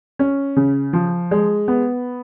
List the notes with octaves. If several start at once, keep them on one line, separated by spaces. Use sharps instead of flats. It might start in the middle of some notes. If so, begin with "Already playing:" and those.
C#4
C#3
F3
G#3
B3